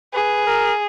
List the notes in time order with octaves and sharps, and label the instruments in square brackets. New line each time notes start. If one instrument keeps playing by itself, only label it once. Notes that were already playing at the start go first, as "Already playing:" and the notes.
[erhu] G#4 [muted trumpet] B4
[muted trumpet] A#4